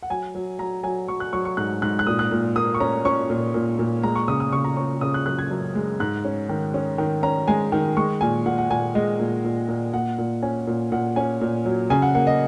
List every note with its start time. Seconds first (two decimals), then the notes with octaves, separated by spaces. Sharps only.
0.03 F#5
0.10 F#3 G#5
0.35 F#3
0.59 F#3 A#5
0.84 F#3 G#5
1.08 F#3 C#6
1.20 F#6
1.33 F#3 C#6
1.45 C#6
1.57 G#2 F#6
1.82 G#2 F#6
1.99 F#6
2.07 A#2 D#6
2.19 F#6
2.31 A#2
2.56 A#3 D#6
2.74 C#6
2.80 C#4 A#5
3.05 C#4 C#6
3.30 A#2
3.54 A#2
3.79 A#2
4.03 G#3 A#5
4.15 C#6
4.28 C#3 D#6
4.40 D#6
4.53 C#3 C#6
4.64 A#5
4.77 C#4 C#6
5.01 C#3 D#6
5.14 F#6
5.26 F#2 F#6
5.39 G#6
5.51 F#2
5.75 G#3
6.00 G#2 F#6
6.25 C#4
6.49 D#3
6.74 C#4
6.98 D#3
7.23 C#4 A#5
7.48 G#3 G#5
7.72 D#3
7.97 G#3 C#6
8.21 A#2 G#5
8.46 A#2 F#5
8.58 F#5
8.70 A#2 G#5
8.95 G#3 D#5
9.19 A#2
9.44 A#2
9.69 A#2
9.93 A#2 F#5
10.18 A#2
10.42 C#4 G#5
10.67 A#2
10.92 A#2 F#5
11.16 C#4 G#5
11.41 A#2
11.65 F#3
11.90 C#3 G#5
12.02 F#5
12.15 A#3 F#5
12.27 D#5